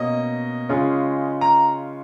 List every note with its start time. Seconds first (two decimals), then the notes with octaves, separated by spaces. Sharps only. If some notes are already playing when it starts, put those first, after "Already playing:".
Already playing: B2 A#3 C#4 D#5
0.69 C#3 G#3 C#4 F4
1.41 A#5